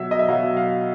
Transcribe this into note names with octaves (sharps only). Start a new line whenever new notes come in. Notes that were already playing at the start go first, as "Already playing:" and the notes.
Already playing: B2 F#3 E5
D#5
E5
B2 F#3 F5
F5